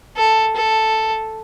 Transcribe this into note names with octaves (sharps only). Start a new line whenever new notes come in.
A4
A4